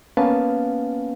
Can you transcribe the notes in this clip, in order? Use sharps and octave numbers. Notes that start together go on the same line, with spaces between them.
A#3 B3 C#4 B4 F5 A5